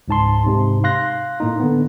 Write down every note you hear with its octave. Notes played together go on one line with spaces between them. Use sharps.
C#2 G#2 A5 C6
G#2 C3
F5 C6 F#6 A#6
A2 A#3 D#4
D3 B3